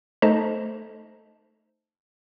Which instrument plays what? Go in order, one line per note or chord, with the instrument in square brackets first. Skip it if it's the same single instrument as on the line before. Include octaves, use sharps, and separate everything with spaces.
[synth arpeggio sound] A3 D#4 A4 C5 D#5 A5